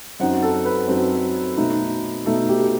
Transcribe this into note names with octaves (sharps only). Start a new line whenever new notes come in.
F#2 F#3 C4 D#4 F#5
A4
B4
F#2 F#3 C4 D#4
B2 A3 D#4
B2 A3 D#4 A4
G4